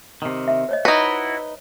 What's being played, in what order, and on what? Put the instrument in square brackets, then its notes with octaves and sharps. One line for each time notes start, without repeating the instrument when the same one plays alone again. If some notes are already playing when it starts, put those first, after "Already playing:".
[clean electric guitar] C3 D#3
[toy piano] E5
C5 C#5 D#5
[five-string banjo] D#4 B4 [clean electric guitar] E4 F#4